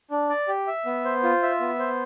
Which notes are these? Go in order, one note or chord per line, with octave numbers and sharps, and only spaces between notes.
D4
D5
G4
E5
B3
C5
F4
E5
B3
C5